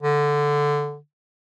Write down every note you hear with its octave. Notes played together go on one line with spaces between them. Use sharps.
D3